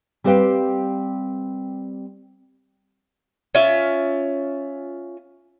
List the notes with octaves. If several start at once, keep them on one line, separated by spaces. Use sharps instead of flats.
G3 C4 G4 B4 F5 G5
C#4 F4 E5